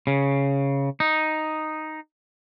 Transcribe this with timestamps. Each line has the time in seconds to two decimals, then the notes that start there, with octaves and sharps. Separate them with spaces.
0.07 C#3
1.00 D#4